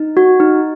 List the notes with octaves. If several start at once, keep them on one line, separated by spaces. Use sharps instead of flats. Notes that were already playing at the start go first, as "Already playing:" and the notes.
Already playing: D#4
F#4
D#4